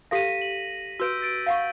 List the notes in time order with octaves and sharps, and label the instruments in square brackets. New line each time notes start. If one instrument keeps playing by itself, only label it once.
[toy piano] G4 A4 F5 [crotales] A#6 B6 D#7
[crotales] F#7
[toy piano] F#4 B4 [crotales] E6 G6 D7
[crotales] E6 A6 D7
[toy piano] F5 F#5 C#6